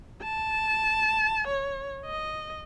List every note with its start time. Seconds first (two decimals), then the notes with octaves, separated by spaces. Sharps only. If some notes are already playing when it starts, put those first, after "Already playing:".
0.23 A5
1.47 C#5
2.06 D#5